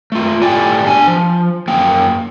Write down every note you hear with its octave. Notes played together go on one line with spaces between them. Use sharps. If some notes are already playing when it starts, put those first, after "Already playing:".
A3 F4
A2 G4 D5 G5 G#5
D4 G#5
F3
F#2 A#3 G5